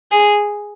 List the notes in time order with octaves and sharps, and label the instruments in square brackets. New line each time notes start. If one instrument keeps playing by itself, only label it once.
[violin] G#4